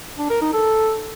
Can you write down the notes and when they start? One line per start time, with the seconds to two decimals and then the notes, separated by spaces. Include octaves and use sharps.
0.18 D4
0.30 A#4
0.42 D#4
0.53 A4